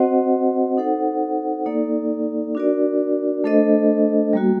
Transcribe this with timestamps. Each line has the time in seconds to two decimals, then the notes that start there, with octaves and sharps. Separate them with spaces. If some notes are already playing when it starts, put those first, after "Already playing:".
Already playing: C4 F#4 C5 D#5 F#5
0.77 D#4 A4 C5 F#5
1.66 A#3 D#4 A4 D5
2.55 D4 F#4 A#4 D5
3.44 A3 D4 A4 C5 D#5
4.33 G3 A#3 F#4